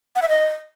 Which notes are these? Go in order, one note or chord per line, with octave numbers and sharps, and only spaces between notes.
F#5
E5
D#5